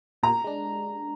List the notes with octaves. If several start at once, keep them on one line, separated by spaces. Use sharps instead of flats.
A#2 A#5
G#3 D4